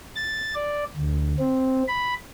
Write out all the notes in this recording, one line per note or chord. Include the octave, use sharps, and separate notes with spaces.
A6
D5
D2
C4
B5